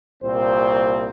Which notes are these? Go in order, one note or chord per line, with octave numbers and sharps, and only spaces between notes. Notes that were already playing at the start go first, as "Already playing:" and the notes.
C2 A#2 C4 C5